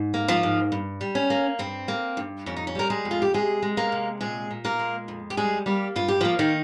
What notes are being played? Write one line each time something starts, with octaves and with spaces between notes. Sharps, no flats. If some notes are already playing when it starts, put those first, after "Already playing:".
Already playing: G#2
A#3
F3 F4
G#2
G2
G3
C#4
A#3
G2 C4
A#3
G2
F2 C#4
D#4
C#4
G3 A#4
G#3 G#4
F2
F4
G4
C3 G#3 G#4
G#3
A#3 A#4
C3
A#2 G#3 G#4
A#2
A#3 A#4
G#3
F2
G4
G3 G#3 G#4
G3 A#3 G4
G2 F4
G4
F3 A#3 F4
D#3 D#4